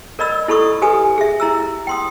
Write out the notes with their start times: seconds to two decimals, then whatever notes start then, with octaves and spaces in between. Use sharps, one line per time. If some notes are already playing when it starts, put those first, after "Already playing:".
0.19 A#4 D5 D#5 B5 E6
0.48 E4 A4 B5 C#6 D#6
0.82 G4 A4 B4 G#5 D#6
1.18 G#4 E5
1.40 E4 A#5 E6
1.87 G5 C6 D#6